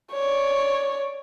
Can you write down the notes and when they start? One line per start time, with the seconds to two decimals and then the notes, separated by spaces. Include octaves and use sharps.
0.13 C#5 D5